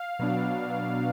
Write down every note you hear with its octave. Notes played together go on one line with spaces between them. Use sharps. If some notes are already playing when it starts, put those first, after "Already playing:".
Already playing: F5
B2 F#3 B3 D4